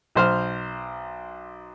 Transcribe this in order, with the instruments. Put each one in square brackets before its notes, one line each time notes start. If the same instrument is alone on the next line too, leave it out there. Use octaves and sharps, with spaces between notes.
[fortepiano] B1 C5 F6